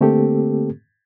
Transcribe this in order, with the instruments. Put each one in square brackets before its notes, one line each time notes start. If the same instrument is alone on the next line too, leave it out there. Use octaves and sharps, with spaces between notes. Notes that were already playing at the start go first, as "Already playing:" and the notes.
[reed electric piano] D3 A3 A#3 C4 G4 A4